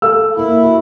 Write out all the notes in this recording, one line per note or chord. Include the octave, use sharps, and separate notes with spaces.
A4 F5 E6
A#3 E4
F#4